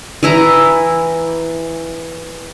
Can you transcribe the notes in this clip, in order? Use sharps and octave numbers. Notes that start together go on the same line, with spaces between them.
E3 E4 A#5